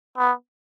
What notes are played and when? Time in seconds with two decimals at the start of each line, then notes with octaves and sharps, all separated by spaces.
0.17 B3